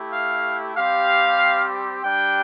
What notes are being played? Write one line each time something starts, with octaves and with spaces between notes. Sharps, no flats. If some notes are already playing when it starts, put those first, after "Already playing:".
Already playing: A3 E4 G4
F5
G3 C4 G4 F5
G3 D4 G4 G5